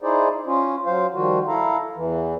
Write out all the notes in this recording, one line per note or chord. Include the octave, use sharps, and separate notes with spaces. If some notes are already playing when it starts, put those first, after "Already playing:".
D#4 E4 G#4 C5 D5
C#4 F4
F#3 C5 F5
D#3 F3 G3 F4 F#4
E4 A4 F5 A#5
E2 E3